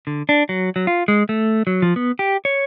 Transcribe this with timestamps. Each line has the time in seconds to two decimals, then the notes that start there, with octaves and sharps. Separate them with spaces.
0.07 D3
0.29 D4
0.49 F#3
0.76 F#3
0.87 F4
1.08 G#3
1.29 A3
1.67 F#3
1.82 F3
1.96 B3
2.19 G4
2.45 C#5